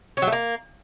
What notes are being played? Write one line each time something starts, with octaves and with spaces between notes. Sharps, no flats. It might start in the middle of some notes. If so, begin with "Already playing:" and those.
C#4
F#3
A3
A#3